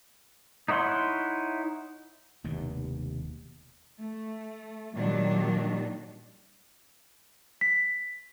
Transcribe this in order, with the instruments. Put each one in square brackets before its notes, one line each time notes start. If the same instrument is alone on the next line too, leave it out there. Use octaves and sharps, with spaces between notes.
[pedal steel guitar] D#4 E4 C#5 F#5 C6
[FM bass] F1 [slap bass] D#2 B2 D#3
[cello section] A3
A#2 D#3 F#3 G3 D4
[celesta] B6